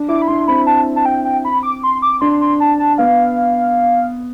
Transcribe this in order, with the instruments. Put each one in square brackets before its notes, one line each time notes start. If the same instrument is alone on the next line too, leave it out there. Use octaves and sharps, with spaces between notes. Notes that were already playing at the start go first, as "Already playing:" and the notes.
Already playing: [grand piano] D4
[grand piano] E4 [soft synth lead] D6
[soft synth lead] B5
[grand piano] D4 [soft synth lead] C6
[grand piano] C4 [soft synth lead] B5
[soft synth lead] A5
A5
G5
G5
B5
D6
C6
D6
[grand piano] D4 [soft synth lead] C6
[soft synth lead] C6
A5
A5
[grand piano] B3 [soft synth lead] F5